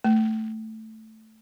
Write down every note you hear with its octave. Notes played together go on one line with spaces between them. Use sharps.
A3